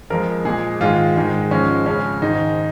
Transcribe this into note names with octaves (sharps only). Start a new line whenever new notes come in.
F2 F3 G#3 A#4
A#2 G#3 G#4
G#2 D#3 G#3 F4
G#2 D#3 G#3
G#2 F3 G#3 C#4
F2 C#3 G#3 C#4
G#2 D#3 G#3 D#4